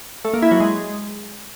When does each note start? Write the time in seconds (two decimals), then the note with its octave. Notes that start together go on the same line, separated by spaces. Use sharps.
0.25 A3
0.34 A#3
0.42 E4
0.51 F#3
0.60 G#3